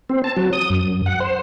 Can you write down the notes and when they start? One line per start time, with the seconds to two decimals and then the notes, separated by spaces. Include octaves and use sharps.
0.10 C4
0.24 A5
0.37 F#3
0.53 D#6
0.70 F#2
1.06 F#5
1.20 C5